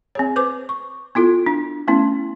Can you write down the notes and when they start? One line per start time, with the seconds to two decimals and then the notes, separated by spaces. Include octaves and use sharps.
0.15 C4 G#4 C#5
0.36 B4 C5 D6
0.69 C#6
1.15 B3 E4 F4 A4
1.46 D4
1.87 A3 B3 C#4 E4